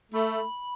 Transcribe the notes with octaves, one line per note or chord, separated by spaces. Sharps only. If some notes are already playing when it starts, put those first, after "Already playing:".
A3 B5